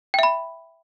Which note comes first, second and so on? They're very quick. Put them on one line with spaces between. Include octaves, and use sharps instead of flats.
G5 E5 B5